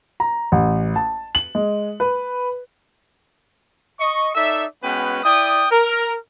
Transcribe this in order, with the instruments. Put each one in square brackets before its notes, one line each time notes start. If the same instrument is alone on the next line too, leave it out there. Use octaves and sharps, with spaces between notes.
[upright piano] A#5
A1
A5
F#7
G#3
B4
[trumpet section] D#5 C#6
D#4 A4 D5 E5
G#3 B3 C#4 F#4 B4 G5
E4 D5 G5 D#6
A#4